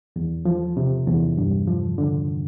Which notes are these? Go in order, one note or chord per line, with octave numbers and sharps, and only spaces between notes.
E2
F3
C3
E2
G2
F3
D3